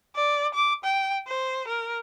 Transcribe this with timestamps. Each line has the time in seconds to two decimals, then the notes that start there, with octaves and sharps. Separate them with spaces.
0.16 D5
0.54 D6
0.84 G5
1.27 C5
1.67 A#4